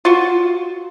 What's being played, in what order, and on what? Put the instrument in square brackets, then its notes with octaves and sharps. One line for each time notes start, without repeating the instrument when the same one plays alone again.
[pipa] F4 F#4